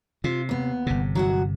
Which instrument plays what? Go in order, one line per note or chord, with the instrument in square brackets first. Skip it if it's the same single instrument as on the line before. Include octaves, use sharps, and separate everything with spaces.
[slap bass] C3 [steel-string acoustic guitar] F4
[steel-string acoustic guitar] D#2 B3
[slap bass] G1 C3
[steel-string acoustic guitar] F#3 F#4 F#5